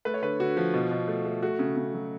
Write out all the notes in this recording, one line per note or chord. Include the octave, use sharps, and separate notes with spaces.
A3 B4
C#5
D3 B4
D3 F#4
F3
B2
B2
A3
A3
A3 F#4
C#3
C#3
F#3